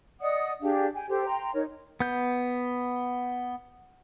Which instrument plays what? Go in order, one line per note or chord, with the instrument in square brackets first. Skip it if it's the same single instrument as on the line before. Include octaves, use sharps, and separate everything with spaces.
[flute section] D5 D#5 F#5 D#6
D4 G4 G#4 F5
G5 G#5
G4 A4 C5
G5 A#5 C6
D#4 A#4 C#5
[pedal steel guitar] B3 G6